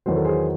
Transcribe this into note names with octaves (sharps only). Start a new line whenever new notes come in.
E2 D#3 F#3 C5
A4
G#4 C5